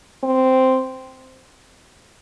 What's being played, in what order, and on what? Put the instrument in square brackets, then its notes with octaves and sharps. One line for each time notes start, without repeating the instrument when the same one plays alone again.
[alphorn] C4